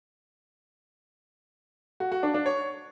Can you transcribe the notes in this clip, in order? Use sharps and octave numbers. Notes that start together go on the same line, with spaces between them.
F#4
F#4
D4
D4
C#5